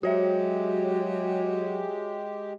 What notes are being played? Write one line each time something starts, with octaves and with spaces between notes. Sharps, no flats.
F#3 G#3 F#4 G4 C#5 E5